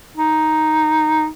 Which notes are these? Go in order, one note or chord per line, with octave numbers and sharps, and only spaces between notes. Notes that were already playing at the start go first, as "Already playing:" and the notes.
D#4